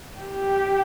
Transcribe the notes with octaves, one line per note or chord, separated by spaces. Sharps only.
G4